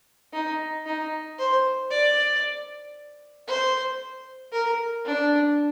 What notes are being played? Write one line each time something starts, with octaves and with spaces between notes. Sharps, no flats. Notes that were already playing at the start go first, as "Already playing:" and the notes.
D#4
D#4
C5
D5
C5
A#4
D4